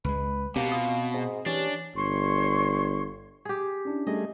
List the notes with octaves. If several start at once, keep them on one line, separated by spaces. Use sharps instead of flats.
C#2 G#3 B4
B2 A#3 C4 G4
F4 D#6
G#2
E3 C#4 D4 G4
G1 C#5 C6 C#6
G4 G#4
C#4 D4 E4
G3 A3 G#4 D#5